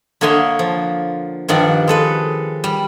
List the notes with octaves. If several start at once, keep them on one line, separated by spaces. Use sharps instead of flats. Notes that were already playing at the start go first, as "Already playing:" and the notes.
D3 A#3 C#5 D#5 E5 C6
F3
G2 D#3 F3 D5 F#5
G#3 A4 B4
G3